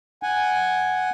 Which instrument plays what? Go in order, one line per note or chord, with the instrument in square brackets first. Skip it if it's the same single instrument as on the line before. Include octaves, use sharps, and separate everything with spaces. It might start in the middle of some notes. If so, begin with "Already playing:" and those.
[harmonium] F#5 G#5